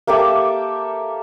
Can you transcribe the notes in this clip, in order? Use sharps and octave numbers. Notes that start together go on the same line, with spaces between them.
A#3 G4 A4 E5